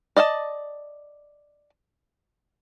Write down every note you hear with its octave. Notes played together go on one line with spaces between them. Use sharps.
D5 D#5 F5 A5